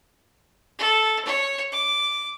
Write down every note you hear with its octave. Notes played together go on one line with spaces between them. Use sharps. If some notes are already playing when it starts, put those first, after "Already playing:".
A4
C#5
D6